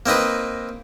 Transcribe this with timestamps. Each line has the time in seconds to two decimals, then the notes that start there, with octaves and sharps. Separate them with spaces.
0.06 A#3 C4 D#4 B4